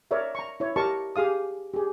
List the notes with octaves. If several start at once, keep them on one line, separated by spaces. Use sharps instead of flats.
A#4 C#5 D5 E5
A#5 C#6
E4 C#5
G4 A#4 D#5 A5 C#6
G4 G#4 F5 D#6
G4 G#4